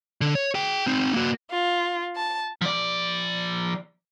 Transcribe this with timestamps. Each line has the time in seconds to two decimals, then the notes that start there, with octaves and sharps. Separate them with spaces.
0.21 D3
0.35 C#5
0.55 G#4 G5
0.87 C4 D#4
1.14 A#3 F#4
1.51 F4
2.16 A5
2.61 F3 D5